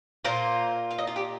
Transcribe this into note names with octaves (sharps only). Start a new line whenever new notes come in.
A#2 A#3 F4 C5
F5
D#5
F4
G4